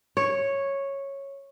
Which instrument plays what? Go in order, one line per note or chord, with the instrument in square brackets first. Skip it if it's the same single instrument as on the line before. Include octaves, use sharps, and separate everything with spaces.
[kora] C#5